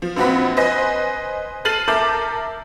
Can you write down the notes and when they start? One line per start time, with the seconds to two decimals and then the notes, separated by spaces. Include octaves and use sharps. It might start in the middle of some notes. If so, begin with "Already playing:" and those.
0.02 F3
0.16 A#1 F3 C4 F#4 B4 B5
0.57 B4 C5 D#5 G#5 A#6
1.65 A4 F6 A6 C7 D#7 F#7
1.88 A4 A#4 E5 A5 D6 G6